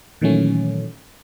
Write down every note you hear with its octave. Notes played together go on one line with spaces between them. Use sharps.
A#2 D#3 E3 F#3 A3 C#4